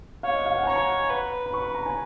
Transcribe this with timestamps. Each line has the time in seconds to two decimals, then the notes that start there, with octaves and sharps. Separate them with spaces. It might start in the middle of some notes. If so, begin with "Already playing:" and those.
0.23 C#5 F5
0.35 D#5
0.46 F5
0.56 F#5
0.63 G#5
0.67 C#5 A#5
1.10 B4
1.46 B5
1.54 C#6
1.64 B5
1.74 A#5
1.86 G#5